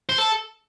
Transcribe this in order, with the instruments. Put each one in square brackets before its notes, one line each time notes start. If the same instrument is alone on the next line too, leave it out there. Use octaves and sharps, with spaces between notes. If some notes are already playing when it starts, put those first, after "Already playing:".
[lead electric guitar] C5
A4